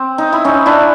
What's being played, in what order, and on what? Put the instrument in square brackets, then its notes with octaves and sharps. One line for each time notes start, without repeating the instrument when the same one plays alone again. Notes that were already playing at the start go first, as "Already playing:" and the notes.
Already playing: [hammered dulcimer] C4
D#4
E4
C#4 D#4
D4 E4